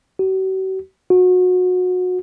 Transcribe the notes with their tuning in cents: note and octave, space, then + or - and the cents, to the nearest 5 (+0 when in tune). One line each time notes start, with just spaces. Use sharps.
F#4 +45
F#4 -25